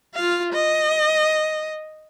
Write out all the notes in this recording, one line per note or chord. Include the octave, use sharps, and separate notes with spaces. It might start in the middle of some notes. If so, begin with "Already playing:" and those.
F4 F5
D#5